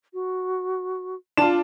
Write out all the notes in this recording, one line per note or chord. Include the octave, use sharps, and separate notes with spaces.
F#4
D4 F4 A5 E7